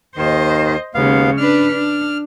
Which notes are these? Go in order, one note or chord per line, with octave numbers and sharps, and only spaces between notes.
D#2 D#3 C5 D#5
D#2 C#3 G#3 B3 F5
D4 B4 F6
D4